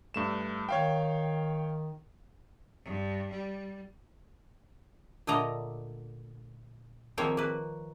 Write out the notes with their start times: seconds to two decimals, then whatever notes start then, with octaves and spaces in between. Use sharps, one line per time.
0.14 G2 A3 E7
0.69 D#3 C#5 F5 G5
2.84 G2
3.30 G3
5.27 A#2 D3 A3 D5 D#5 A#5
7.18 D#3 F3 A#3 C4 C#5 G5
7.37 A#3 B4